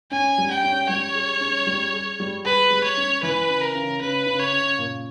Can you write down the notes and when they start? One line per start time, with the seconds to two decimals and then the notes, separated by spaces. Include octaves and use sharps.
0.11 C#4 G#5
0.38 G3
0.50 G5
0.64 C#4
0.89 G3 C#5
1.15 G#4
1.41 C#4
1.67 G3
1.93 G#4
2.20 G3
2.45 G#4 B4
2.71 G3
2.84 C#5
2.97 C#4
3.23 E3 B4
3.49 C#3
3.61 A#4
3.75 C#3
4.00 C#3 B4
4.26 C#3
4.40 C#5
4.53 C#3
4.79 A#2